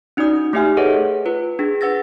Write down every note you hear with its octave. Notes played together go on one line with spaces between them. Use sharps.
C#4 D#4 F#4 D5 D#6 G6
A3 D#4 G4 E5 G#5 F6
G#4 A4 B4 C#5 D#5 F#5
F4 B4
D4 G#4
B4 F#5 E6 A6 A#6